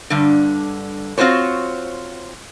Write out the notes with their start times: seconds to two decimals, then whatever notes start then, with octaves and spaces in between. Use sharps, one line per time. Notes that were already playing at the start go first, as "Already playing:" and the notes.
0.10 G2 D3
1.18 C4 F4 F#4 C5 C#5